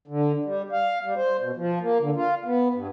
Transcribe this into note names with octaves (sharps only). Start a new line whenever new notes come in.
D3
G3
F5
G3
C5
B2
F3
A#3
D3
F4
B3
G2